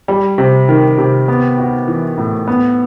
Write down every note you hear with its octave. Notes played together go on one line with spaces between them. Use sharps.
G3
C3
D#3
C3
B3
F#4
E3
A2
B3